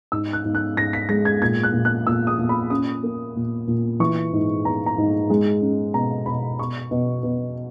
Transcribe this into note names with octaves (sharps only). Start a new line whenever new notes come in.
G#2 E6
F#6
G#2
F#6
G#2 A#6
B6
G#3 A#6
G#6
A#2 G#6
F#6
A#2
F#6
A#2 E6
D#6
A#2
B5
C#4 D#6
A#3
A#2
A#2
E3 C#6
G#2
B3 A#5
A#5
G#2
G#3
C#4
B2 A#5
B2 B5
B2 C#6
B2
B2